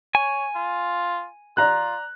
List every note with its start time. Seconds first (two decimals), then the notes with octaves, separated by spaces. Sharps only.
0.15 C#5 G#5
0.55 F4
1.57 F4 D5 A#5 F#6